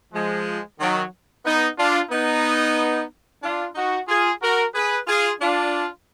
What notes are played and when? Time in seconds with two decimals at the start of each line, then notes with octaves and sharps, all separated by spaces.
0.13 F3 G#3
0.79 D#3 F#3
1.45 B3 D#4
1.78 D4 F4
2.11 B3 D#4
3.43 D4 F4
3.75 D#4 F#4
4.08 F4 G#4
4.41 F#4 A#4
4.74 G#4 B4
5.07 F4 G#4
5.40 D4 F4